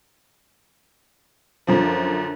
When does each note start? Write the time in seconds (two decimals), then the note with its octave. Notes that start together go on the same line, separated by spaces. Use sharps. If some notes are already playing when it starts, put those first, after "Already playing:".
1.67 F#2 D3 F3